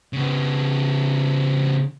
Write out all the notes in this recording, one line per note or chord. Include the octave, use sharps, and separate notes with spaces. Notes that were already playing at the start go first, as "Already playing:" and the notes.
C#3 B3